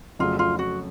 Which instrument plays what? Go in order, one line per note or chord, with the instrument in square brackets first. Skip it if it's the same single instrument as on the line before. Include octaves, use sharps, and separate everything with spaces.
[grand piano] F2 C#3 F#3 A3 [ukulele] F4
[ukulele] F4
F#4